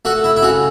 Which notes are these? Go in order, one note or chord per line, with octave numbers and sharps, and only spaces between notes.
A3 F#4
E4
E4
C#3 F#4